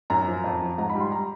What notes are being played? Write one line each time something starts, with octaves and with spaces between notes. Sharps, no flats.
F#2 A#5
F3
F2
F3
G#2 A#5
B5
G3
C6
A#5